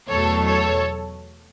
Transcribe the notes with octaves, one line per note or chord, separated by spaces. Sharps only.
E2 B2 F#3 A3 A4 C#5
A4 C#5